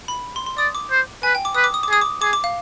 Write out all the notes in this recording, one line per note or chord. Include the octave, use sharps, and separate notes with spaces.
B5
C6
C6
D5 D#6
D6
C5
B4 G#5
G5
D6
B4 D#6
D6
D#6
D6
G#4 D#6
D6
G#4 D6
D6
F5